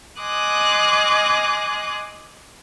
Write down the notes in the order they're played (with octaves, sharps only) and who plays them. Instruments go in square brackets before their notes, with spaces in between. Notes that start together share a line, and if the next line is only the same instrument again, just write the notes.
[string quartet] D#5 G#5 C6 D6 D#6 F#6